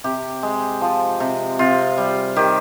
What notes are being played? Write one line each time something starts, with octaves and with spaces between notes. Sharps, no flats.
C3 G4
G#3
F3
C3
C3 F4
G3
D#3 G4